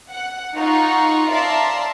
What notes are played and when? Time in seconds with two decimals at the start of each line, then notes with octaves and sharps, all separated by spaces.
0.10 F#5
0.56 D#4 F4 F#5 A#5 C#6
1.30 D5 E5 F5 A5 A#5 C6